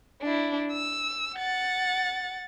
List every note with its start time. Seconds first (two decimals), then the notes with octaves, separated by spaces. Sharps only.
0.22 D4 E4
0.72 E6
1.37 F#5 A6